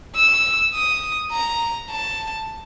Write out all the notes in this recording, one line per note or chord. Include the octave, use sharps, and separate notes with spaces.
E6
D#6
A#5
A5